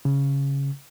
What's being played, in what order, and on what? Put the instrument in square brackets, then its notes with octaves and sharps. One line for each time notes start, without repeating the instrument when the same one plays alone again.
[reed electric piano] C#3